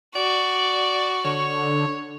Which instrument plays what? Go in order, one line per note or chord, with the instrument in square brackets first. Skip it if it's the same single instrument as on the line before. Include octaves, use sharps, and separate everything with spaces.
[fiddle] F#4 [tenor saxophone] D5
[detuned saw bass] D3 [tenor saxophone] C#5